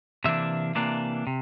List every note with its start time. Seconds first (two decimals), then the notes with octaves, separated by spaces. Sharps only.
0.24 C3 E3 A#3 D4 E5
0.75 C3 E3 A#3 D4
1.27 C3